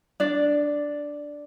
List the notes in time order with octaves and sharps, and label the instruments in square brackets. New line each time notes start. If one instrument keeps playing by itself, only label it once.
[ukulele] D4 D5